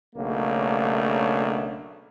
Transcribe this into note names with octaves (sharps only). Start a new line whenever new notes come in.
B1 C#3 A3 A#3 D4